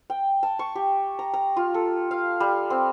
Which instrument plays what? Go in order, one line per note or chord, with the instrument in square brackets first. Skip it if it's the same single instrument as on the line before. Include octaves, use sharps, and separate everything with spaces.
[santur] G5
A5
C#6
G4
A#5
A#5
F4
A4
F5
G3
C4